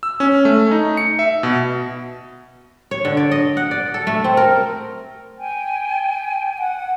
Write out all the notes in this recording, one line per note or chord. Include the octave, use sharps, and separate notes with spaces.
E6
C#4
A3
D#4
C#7
E5
B2
C#5
D3
D5
D#5
F#5
D5
A4
A3
C4
A#4
G5 G#5
F#5